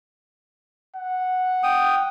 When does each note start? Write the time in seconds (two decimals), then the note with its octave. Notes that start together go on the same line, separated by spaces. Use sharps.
0.95 F#5
1.63 G5 D#6